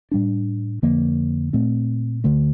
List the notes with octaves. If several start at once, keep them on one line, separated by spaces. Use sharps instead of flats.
A2 G3 D4
F2 D3 F3 A#3
A#2 A3 C4
D2 D3 A3